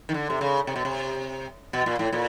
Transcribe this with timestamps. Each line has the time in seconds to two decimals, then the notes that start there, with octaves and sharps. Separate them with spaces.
0.09 D#3
0.14 D3
0.30 C3
0.41 C#3
0.67 C3
0.76 B2
0.85 C3
1.73 B2
1.86 A#2
1.99 A2
2.12 A#2